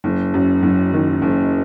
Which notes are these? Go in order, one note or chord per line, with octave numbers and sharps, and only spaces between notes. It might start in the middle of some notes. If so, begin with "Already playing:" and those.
F#1
F#2
F#1
D#3
F#1